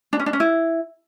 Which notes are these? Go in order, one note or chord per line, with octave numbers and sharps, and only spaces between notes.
D4
C#4
D4
C#4
E4